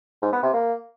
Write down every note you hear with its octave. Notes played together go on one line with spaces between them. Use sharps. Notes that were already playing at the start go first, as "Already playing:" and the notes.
G#2
B3
C3
A#3